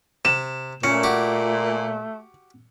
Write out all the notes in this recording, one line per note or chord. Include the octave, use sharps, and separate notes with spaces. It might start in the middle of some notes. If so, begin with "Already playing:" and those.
C3 E7
A#2 A3 C#4 C#7
F#4 G4